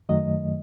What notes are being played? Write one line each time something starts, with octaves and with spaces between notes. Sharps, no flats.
F#2 D#3 F#3 A3 D#5